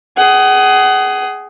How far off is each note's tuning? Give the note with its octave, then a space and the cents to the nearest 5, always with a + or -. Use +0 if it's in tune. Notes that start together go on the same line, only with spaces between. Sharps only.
G#4 +0 F#5 +35